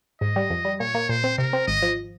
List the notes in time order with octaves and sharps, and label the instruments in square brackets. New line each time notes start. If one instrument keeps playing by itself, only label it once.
[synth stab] G#2 [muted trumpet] D#5
[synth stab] G3
F2
G3
[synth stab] A#2 [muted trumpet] C#5
[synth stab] A#3
[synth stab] A#2 [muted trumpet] C5
[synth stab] C4
[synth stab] C3 [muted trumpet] A#4
[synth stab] C4
[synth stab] G#1 [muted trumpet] D#5
[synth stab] F3